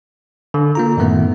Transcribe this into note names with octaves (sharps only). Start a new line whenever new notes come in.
D3
A#3 F4 A#5
F#2 A2 D#3 A3 B3